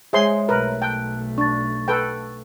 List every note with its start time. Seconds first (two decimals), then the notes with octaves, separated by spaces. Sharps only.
0.13 G#3 G#4 C5 C#5 E5 C6
0.49 B1 A3 A#4 B4
0.82 G5 A5 F#6
1.38 D4 C#6 A6
1.88 A4 B4 G5